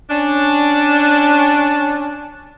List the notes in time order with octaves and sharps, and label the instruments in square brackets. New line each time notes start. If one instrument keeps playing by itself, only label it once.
[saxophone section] C#4 D4